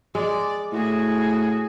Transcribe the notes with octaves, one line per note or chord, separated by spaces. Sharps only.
G#3 D5
A2 F#4 G#4